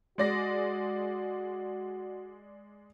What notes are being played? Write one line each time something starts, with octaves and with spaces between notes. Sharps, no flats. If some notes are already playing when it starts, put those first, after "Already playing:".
G#3 F#4 D5 A#6